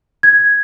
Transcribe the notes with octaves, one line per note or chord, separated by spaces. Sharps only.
G#6